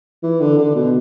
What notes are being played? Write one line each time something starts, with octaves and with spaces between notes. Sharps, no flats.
E3
D3
D3
B2